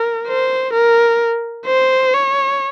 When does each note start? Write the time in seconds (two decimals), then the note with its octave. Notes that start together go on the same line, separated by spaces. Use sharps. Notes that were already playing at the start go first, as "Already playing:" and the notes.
Already playing: A#4
0.27 C5
0.73 A#4
1.66 C5
2.14 C#5